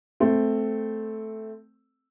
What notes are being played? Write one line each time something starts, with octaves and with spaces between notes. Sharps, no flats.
A3 C4